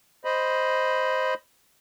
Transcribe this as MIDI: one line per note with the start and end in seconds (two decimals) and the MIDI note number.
0.25 1.34 72
0.25 1.34 75
0.25 1.34 83